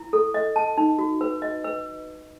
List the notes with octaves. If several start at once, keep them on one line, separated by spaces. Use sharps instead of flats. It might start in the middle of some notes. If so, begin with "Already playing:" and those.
Already playing: E4
A4
D#5
A5
D#4
F#4
B4
D#5
B4